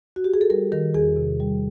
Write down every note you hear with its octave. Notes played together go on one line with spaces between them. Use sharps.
F#4
G4
G#4
A4
G3 A#4
D#3 A#4
E2 G#4
C3
G3